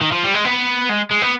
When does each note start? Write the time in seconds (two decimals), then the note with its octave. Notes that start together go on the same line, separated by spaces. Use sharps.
0.01 D#3
0.12 F3
0.23 G3
0.34 G#3
0.45 B3
0.89 G#3
1.11 G#3
1.22 B3